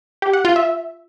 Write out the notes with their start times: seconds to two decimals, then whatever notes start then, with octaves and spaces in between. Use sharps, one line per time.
0.22 G4
0.33 F#5
0.45 F4
0.56 E5